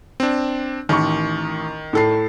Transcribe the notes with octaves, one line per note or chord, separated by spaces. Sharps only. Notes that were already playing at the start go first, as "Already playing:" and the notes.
C4 D4
A1 D#3 A#4 C#6
A2 A4 C7